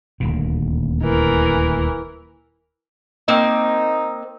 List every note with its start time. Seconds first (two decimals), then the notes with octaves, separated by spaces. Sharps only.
0.20 D#1 D2 A#2
1.03 E3 A#4
3.28 A#3 C4 D#4